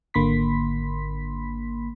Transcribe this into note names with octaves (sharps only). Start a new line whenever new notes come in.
G#1 D3 A#3 B5 C6 B6